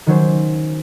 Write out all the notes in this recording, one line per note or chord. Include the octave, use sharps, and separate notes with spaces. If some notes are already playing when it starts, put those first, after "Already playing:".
D#3 F#3 C#4 C5